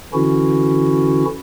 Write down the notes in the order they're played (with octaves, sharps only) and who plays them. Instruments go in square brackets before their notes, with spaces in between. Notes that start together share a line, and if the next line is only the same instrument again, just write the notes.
[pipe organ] D3 E3 C#4 E4 F#4